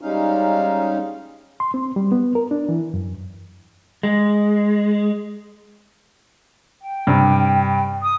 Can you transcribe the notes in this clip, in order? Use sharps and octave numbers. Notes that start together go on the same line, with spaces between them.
G3 G#3 C#4 D#4 F5
C6
C4
G3
B3
A#4
D4
E3
F#2
G#3
G5
G2 C3
D#6